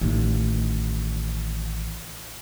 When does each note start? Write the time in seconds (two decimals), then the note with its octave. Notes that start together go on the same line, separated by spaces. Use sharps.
0.01 A1 D#3